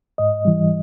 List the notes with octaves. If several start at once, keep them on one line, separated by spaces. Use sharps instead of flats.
G#2 D#5
E3 G3